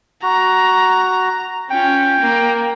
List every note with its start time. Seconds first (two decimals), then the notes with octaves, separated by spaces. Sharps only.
0.23 F#4 A#5
1.70 C#4 F4 G5
2.20 A#3